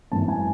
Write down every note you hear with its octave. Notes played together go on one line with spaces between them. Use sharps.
G#1 F#2 E3 A5
G#5